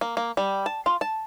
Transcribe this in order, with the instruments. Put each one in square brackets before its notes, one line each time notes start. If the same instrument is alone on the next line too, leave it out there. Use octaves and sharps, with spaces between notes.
[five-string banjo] A#3
A#3
G3
A5
F4
A5